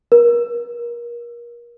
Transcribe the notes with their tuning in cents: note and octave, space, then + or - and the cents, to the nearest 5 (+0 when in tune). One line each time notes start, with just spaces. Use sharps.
A#4 +30